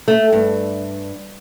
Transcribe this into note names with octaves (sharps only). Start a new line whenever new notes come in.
A3
G2